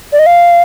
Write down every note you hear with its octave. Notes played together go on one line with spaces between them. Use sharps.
D5
D#5
F5